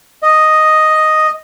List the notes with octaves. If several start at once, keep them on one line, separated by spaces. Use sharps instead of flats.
D#5